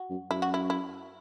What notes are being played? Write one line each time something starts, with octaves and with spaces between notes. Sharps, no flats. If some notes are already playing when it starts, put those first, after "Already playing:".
Already playing: F#4
F#2
F#2 E4
F#4
E4
E4